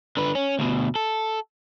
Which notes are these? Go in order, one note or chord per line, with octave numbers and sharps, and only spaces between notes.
D3 B4
C#4
D2 B2
A4